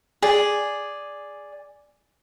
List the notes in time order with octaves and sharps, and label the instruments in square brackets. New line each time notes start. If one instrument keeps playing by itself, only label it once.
[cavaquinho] G#4 D5